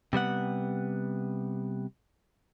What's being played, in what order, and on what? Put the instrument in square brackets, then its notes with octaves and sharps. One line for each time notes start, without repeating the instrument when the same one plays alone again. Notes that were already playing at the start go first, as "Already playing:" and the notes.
[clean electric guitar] C3 G3 B3 F#5